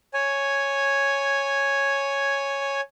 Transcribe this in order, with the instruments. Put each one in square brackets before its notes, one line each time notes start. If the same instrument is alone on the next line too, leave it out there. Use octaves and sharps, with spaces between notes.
[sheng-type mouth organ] C#5 G#5